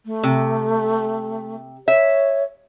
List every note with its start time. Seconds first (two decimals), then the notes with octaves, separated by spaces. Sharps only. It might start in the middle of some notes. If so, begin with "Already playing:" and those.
0.06 A3
0.23 C3
1.88 C#5 E5